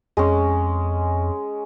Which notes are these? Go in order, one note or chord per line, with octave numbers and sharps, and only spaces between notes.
F2 G#3 C#4